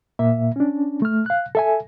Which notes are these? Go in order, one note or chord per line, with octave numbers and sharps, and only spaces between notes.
A#2 A#3 E5
C#4 D4
A3 F6
F5 F#6
A4 E5 G#5